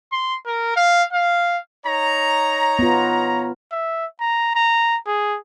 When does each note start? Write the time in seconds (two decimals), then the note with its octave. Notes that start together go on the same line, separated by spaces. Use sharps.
0.12 C6
0.46 A#4
0.76 F5
1.13 F5
1.86 D#4 C#5 A#5
2.79 B3 F4
3.72 E5
4.20 A#5
4.55 A#5
5.06 G#4